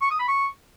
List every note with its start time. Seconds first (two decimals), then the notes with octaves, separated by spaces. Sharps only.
0.02 C#6
0.10 D#6
0.19 B5
0.28 C#6